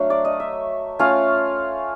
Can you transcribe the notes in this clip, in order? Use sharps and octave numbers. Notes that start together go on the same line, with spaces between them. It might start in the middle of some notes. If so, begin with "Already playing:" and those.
Already playing: F#3 A3 D4 F5
D5
D#5
E5
A3 C#4 F4 F5